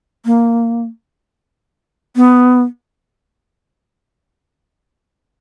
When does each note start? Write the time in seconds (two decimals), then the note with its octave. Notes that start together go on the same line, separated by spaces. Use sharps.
0.26 A#3
2.16 B3